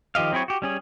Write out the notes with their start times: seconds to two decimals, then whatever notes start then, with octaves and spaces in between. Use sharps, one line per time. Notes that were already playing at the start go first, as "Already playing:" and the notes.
0.15 D#3 F3 G4 D#5 F5
0.32 F#3 C4 E4 G#4 C#5
0.48 F#4 G4
0.62 G3 C#4 G#4